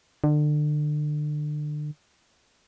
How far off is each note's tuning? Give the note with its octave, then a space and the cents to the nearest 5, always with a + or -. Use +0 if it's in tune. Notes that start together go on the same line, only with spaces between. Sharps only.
D3 +30